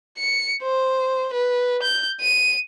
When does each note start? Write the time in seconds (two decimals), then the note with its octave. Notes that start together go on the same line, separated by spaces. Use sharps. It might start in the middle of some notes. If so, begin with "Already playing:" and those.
0.18 C#7
0.63 C5
1.33 B4
1.82 G6
2.21 D#7